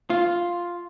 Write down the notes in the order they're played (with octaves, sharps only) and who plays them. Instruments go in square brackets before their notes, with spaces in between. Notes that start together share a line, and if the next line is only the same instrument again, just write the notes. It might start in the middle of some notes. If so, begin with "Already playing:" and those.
[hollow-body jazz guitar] F4